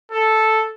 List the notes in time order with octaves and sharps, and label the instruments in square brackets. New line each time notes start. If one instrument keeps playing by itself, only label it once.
[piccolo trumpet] A4